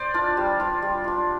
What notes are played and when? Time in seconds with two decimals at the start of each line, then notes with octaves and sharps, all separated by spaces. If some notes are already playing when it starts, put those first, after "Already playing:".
Already playing: C5 D5
0.14 D4 F4
0.37 G3
0.60 D4 F4
0.82 G3
1.04 D4 F4